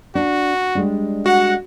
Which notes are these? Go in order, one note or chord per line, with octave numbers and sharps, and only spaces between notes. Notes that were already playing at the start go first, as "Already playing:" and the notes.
D4 F#4
G3 G#3 D4
F#4 F#5